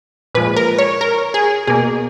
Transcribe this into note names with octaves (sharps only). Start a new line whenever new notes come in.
A#2 F3 G#3 B4
A#4
C#5
A#4
G#4
B2 A#3 G#4